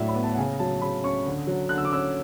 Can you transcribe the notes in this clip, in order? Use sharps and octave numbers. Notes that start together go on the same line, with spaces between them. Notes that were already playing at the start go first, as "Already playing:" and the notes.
Already playing: A2 F#3 D4 D5 E5
B5
B3
A5
F#5
C#3 G#5
F#3 A5
C#3 B5
C#4 C#6
D3
F#3
D3 F#6
E6
D6
C#4 E6